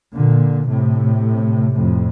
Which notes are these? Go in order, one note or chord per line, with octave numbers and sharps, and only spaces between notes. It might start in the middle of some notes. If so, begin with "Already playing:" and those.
A#2 D3
A2 C3
F2 A2